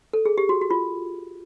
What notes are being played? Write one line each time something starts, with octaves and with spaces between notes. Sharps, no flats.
A4
G#4
G4
F#4
F#4
F4